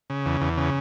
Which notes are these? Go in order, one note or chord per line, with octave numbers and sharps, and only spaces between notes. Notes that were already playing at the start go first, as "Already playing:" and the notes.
C#3
E2
E2
C#3